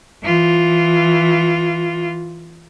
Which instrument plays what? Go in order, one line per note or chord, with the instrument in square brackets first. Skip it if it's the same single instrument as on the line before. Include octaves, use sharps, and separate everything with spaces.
[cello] E3 F4